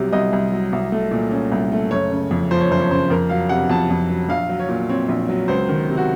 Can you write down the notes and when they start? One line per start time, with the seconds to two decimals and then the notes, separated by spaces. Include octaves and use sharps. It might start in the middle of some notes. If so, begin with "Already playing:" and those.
Already playing: C2 C3 F#3
0.12 C2 D#5
0.33 C2
0.52 F#3
0.73 C2
0.92 A3
1.11 A#2
1.31 C#4
1.52 C2
1.72 A3
1.91 F#1 C#5
2.11 C#3
2.31 F2
2.51 F3 C5
2.61 C#5
2.71 F#1 C5
2.81 C#5
2.91 C#3 C5
3.10 F2 A#4
3.30 F#3 F5
3.49 C3 F#5
3.70 F2 A5
3.90 F2
4.10 F#3
4.29 A#1 F5
4.49 F#3
4.60 C#5
4.69 A#2
4.90 C4 C#5
5.09 A#1
5.29 F#3
5.48 C#2 C5
5.69 D#3
5.89 C3
5.97 F#4